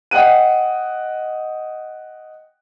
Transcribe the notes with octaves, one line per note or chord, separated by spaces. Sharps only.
D#5 F#5 G5 F#6 D#7